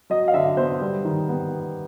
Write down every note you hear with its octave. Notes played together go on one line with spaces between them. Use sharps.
F#3 D#5
F5
D3 E5
B3 C5
G3
D#3
B3